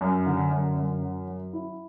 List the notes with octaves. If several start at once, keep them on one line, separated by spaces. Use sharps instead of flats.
F#2
D3
F#2
F#2
F#3
F#3
E4